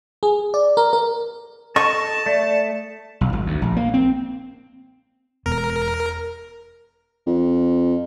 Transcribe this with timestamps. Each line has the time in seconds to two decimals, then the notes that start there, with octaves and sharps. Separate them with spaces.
0.23 G#4
0.54 D5
0.77 A#4
0.93 A#4
1.76 A4 D#5 A5 C#6
2.26 A3 D5
3.21 B1
3.33 G#1
3.46 D2
3.62 A#1
3.76 A#3
3.94 C4
5.46 E1 B3 A#4
7.27 F2